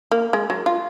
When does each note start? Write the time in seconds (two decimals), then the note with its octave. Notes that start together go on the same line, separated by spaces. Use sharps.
0.11 A#3
0.33 G#3
0.50 F#3
0.66 F4